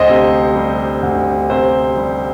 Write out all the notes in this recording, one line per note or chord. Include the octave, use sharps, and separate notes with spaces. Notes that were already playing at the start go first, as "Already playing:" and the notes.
Already playing: D2 C5 D#5
C3
G3
D2
C3 C5
G3